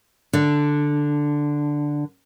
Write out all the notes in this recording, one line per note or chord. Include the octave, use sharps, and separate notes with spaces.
D3 D4